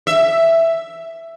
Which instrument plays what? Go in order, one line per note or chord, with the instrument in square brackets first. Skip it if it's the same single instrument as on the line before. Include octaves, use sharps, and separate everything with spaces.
[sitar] E5